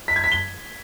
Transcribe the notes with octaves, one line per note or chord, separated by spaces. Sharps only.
B6
G#6
B6
G7